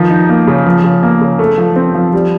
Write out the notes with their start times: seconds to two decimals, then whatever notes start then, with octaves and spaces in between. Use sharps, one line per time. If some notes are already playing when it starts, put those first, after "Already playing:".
Already playing: D#3 F3
0.10 D#4
0.29 A#3
0.47 C#3
0.66 F3
0.84 C#3
1.03 A#3
1.21 C#3
1.39 A3
1.58 F3
1.76 C4
1.95 F3
2.13 G3